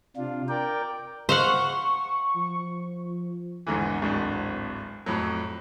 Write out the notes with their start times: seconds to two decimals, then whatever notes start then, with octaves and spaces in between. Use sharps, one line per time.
0.17 C3 D4 F4
0.49 A#4 D5 G5
1.29 C5 F5 F#5 C#6
2.36 F3
3.67 G#1 E2 G#2 D3 E3
4.02 D1 G#1 G#2 D4
5.06 F2 A2 F#3